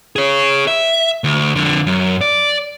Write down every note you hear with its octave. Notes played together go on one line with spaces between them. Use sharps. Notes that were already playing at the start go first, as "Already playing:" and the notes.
G#4 C#5
E5
D2
F2 D3
F#2
D5